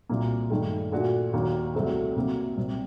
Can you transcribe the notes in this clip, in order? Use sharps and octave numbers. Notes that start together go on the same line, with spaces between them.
C2 A#2 F#3 A#3
G2 D#3 A3
A#2 A3 D4 F#4
D#2 D#3 F#3 A#3 D4
C2 C3 F#3 A3 C4
C3 F#3 A#3
C2 C3 G3